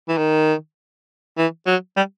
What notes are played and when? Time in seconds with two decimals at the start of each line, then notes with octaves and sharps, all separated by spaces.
0.09 E3
0.18 D#3
1.37 E3
1.66 F#3
1.97 G3